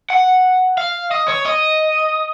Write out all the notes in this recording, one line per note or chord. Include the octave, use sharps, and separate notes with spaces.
F#5
F5
D#5
C#5
D#5